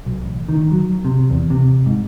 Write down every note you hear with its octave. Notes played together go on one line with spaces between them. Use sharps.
B1
A1
D#3
F#3
C3
E2
C3
G#2